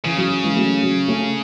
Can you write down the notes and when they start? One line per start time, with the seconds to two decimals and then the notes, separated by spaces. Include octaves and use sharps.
0.04 C#3 E3
0.17 F#3
0.30 F#3
0.43 E3 G#3
0.56 F#3 A3
0.83 F#3
1.08 A3 C#4